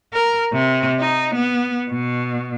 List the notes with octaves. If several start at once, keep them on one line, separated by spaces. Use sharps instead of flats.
A#4
C3
D#4
B3
B2